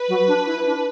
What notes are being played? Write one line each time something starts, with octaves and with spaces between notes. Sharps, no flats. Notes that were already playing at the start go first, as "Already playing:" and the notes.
Already playing: B4
F#3
D4
E4
D4